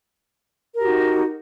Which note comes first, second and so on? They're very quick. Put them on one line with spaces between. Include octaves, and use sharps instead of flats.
A#4 G4 F#4 D#4